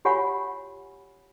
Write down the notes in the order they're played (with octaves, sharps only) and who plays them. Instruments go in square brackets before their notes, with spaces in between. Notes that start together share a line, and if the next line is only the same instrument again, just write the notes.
[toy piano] F4 G4 C#5 F#5 G#5 B5